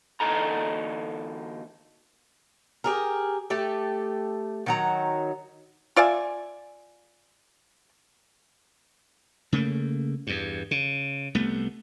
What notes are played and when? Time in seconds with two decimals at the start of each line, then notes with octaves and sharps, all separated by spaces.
0.20 D2 G2 E3 D#4 A4 A#5
2.84 G4 G#4 A#4
3.50 A3 G4 A4
4.66 D#3 F#3 A#5
5.96 F4 D5 E5 G#5
9.52 C#3 A3 A#3
10.27 E2 G2
10.71 C#3
11.35 C2 A3 B3